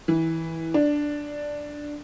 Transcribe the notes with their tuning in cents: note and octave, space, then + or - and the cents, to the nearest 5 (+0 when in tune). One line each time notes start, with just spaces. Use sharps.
E3 -20
D4 +0